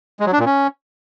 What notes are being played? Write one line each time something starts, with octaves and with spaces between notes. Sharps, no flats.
G#3
F#3
D4
A#2
C#4